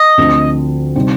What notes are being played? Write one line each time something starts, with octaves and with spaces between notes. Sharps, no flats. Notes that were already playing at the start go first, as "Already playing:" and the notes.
Already playing: D#5
D2 D3 F3 C4
C3 G3 C4 D#4